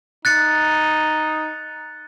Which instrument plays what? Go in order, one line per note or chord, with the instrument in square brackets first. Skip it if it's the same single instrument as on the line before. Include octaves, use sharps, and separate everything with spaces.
[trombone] D#4 [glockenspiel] F#6 A6 C#7